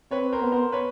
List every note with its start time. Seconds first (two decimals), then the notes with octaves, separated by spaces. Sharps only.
0.11 C4 B4 C#5
0.32 A#4 C5
0.42 B3
0.52 A#4 C5
0.72 B4 C#5